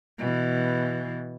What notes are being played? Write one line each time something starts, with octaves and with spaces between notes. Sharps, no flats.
B2 E3